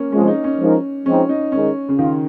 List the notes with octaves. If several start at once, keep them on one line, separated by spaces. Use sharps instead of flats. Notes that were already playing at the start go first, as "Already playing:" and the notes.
Already playing: A#3 C#4
C3 F3 G#3 C#4
D#4
C#4
F3 G#3 D#4 A#4
F3 G#3 C4 C#4 D#4
D#4
D#3 G#3 C#4 D#4 G#4
C#3
D#3 F4